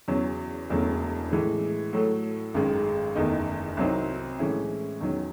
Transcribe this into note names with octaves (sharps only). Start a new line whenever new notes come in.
E2 C#3 F#3 C#4
E1 E2 C#3 F#3 A3
A2 E3 G#3
A2 F#3 A3
G#1 F#2 D#3 G#3
F#1 E2 D#3 A3 D#4
C2 C3 F#3 C4 D#4
A2 E3 G#3 C#4 E4
E2 D#3 F#3 C#4